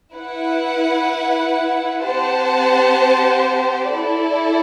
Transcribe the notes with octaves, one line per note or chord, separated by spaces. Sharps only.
E4 B4 F#5
C4 G4 C5 F#5 A5
E4 A4 D5